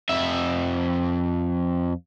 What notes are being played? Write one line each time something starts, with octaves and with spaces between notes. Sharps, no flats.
F2 E5